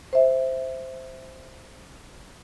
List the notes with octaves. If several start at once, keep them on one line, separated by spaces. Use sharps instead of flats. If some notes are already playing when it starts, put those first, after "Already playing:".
C5 E5